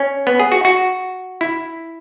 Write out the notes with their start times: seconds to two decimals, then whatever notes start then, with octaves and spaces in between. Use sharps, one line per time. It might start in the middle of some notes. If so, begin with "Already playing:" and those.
Already playing: C#4
0.27 B3
0.40 G#4
0.52 F#4
0.65 F#4
1.41 E4